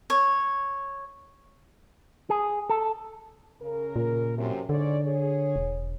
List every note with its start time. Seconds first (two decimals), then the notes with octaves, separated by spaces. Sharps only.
0.10 C#5
2.30 G#4
2.69 A4
3.61 C#3 A#4
3.96 A#2
4.37 F#2 C3
4.69 G#2 D3 C#5 D5
5.04 G#4 C#5
5.56 E1